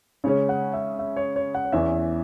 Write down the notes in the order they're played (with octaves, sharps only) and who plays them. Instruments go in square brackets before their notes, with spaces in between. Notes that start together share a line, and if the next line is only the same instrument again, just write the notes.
[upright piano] C#3 G#3 C#4 [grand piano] C#5
[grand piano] F#5
E5
E5
C#5
C#5
F#5
C#5
[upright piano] E2 E3 C#4 [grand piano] E5